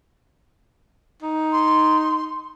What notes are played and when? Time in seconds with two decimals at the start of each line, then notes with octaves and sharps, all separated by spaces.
1.23 D#4
1.52 C6